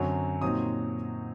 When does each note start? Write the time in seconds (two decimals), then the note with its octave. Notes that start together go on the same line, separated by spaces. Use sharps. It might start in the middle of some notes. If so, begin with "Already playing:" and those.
Already playing: F#2 D3 F#3 C4
0.42 A#2 F#3 C4 D#4 D#6